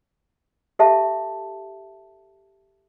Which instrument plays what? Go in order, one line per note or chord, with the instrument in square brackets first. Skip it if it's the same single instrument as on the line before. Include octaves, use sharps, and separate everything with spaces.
[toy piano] G4 A4 E5 F5 A5